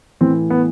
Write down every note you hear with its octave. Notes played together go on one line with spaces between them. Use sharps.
A2 E3 C4
B3